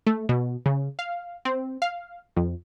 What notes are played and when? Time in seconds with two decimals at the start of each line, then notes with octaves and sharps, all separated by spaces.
0.07 A3
0.29 B2
0.66 C#3
0.99 F5
1.45 C4
1.82 F5
2.36 F2